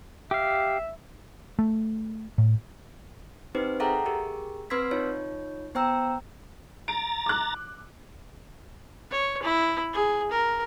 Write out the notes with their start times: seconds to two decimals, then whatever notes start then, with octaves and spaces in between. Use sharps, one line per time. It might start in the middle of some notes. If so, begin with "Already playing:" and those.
0.31 G4 E5 F5
1.59 A3
2.38 A2
3.55 C4 D#4 G4 B4 C5
3.80 G#4 A4 E5 F#5 G5 A#5
4.06 G4 G#4 A#4
4.70 C4 B4 C6 E6 G#6 B6
4.91 D#4 F4 C#5
5.75 B3 C5 G5 A#5 E6
6.88 A#5 A6 D7
7.26 D6 F#6
9.11 C#5
9.43 E4
9.93 G#4
10.31 A#4